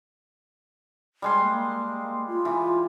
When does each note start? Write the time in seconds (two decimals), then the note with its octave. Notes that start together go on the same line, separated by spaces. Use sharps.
1.22 G3 G#3 C6
1.42 A#3
2.28 F4
2.45 E3